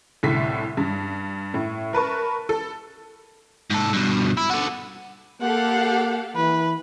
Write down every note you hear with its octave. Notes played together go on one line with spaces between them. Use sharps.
C2 A2 D3 B6
G2
A2
A#4 B4 A5 C#6
A4
G#2 A4
G2 B2
E4
F#4 A4
A#3 G4 A4 F5 F#5
E3 B4